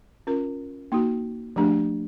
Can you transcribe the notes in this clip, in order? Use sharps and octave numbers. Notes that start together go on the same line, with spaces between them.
C#4 F4 A#4
A#3 D#4 F#4
F3 A3 D4 G4